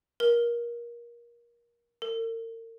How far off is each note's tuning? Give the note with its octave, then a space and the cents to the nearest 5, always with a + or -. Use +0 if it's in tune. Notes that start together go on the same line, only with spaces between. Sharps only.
A#4 +25
A#4 -40